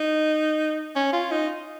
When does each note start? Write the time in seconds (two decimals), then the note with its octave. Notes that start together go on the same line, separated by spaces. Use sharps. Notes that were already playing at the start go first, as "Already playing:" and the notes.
Already playing: D#4
0.96 C#4
1.13 F4
1.31 D#4